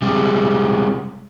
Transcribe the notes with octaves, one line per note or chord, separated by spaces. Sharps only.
C3 G3 G#3